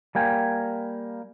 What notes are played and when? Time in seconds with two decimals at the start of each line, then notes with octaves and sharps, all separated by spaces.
0.15 G3 A#3 G5 G#5